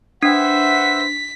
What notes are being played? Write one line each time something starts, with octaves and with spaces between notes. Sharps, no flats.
D4 B4 C5 E5 F#5 B6